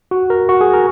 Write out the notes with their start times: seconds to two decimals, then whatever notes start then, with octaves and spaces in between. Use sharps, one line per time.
0.11 F#4
0.30 A#4
0.49 F#4
0.61 G#4
0.73 A#4